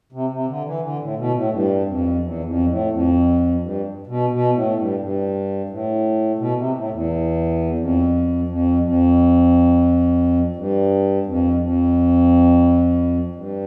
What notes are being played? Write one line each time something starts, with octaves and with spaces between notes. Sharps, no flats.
C3
C3
D3
E3
D3
A2
B2
A2
G2
F2
E2
F2
A2
F2
G2
B2
B2
A2
G2
G2
A2
B2
C3
A2
E2
F2
F2
F2
G2
F2
F2
G2